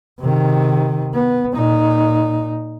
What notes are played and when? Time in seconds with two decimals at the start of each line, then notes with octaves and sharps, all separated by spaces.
0.20 C3 D#3
1.14 B3
1.53 A#2 D#4